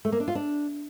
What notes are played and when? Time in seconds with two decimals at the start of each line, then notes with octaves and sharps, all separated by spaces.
0.05 A3
0.12 A#3
0.20 D4
0.28 F4
0.35 D4